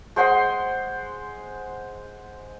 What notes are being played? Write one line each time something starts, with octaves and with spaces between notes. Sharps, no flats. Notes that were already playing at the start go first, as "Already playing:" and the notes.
G#3 C5 F#5 C6